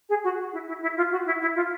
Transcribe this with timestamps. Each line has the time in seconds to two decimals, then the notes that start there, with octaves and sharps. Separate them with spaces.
0.09 G#4
0.24 F#4
0.53 E4
0.68 E4
0.82 E4
0.97 F4
1.12 F#4
1.26 E4
1.41 E4
1.56 F4